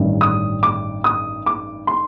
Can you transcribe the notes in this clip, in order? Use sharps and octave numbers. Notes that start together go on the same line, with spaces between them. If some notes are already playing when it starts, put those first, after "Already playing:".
Already playing: A1 G2 D#3
D#6
D6
D#6
D6
C6